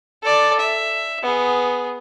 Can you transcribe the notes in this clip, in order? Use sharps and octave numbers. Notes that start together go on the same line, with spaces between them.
A4 D5
E5
B3 G#4